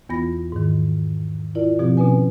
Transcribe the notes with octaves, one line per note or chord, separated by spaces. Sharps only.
E2 E3 B3 F4 B5 A#6
G#2 D#3
E4 F4 A#4 D5
B2 F3 C4 G4
B2 B3 C#4 B4 G#5